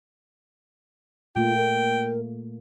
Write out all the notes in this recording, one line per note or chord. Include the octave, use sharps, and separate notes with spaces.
A#2 A3 A#3 F4 G5
A#4